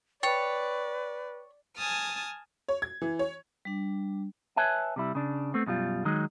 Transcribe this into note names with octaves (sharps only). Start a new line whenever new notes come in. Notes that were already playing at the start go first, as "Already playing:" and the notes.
B4 C#5 D5 G5 A6
G#5 A5 D#6 F6
C#5
G#6
E3
C#5
G3 D4
B4 C#5 E5 G#5 A5
C3 G3 E4
C#3 D4
A3 B3 C4
F#2 B2 G3 F4
D#3 F#3 G#3 D#4